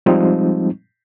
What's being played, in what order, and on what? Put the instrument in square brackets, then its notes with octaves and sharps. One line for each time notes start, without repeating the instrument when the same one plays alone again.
[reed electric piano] F3 G3 G#3 C4 D#4